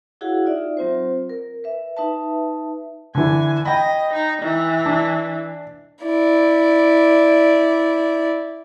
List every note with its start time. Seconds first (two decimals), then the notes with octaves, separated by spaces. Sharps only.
0.21 E4 F#4 G#4 C#5 F5 F#5
0.45 D#4 F4 D5 E5
0.77 F#3 C4 F4 C5
1.30 A#4
1.64 B4 E5
1.97 D#4 B4 E5 A5
3.15 D3 E3 G#5
3.65 D#5 G5 B5
4.13 D#4
4.42 E3
4.86 D4
6.04 E4 D5